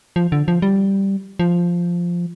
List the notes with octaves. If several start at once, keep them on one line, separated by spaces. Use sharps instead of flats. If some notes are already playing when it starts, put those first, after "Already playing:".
F3
D3
F3
G3
F3